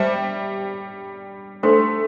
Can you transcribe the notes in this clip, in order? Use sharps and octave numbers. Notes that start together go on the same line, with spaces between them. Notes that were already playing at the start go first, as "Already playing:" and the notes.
Already playing: G3 G4 C5 E5 A5
A3 D4 A4 C5 G5 C6